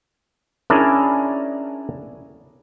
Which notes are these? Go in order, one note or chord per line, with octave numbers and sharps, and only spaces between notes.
C#4 D4 E4 G#4 A#4 D5